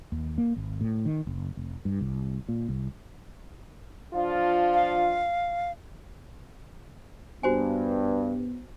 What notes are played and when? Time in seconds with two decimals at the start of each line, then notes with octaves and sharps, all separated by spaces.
0.12 D#2
0.38 A#3
0.56 G#1
0.81 A2
1.05 D#3
1.27 F#1
1.57 F1
1.85 G2
2.01 C2
2.48 A#2
2.69 C2
4.14 F3 D4 F4
4.74 F5
7.43 G2 B3 F#4 C5 G#5